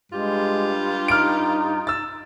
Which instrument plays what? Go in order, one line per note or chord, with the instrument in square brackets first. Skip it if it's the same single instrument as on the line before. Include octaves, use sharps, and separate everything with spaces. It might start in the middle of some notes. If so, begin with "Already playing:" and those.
[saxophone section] G2 F4 G4 [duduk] G#3
[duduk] D#4 [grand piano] F6 D7
[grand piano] E6 A6